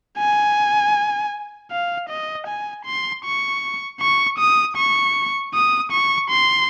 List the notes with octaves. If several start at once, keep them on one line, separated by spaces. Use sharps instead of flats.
G#5
F5
D#5
G#5
C6
C#6
C#6
D#6
C#6
D#6
C#6
C6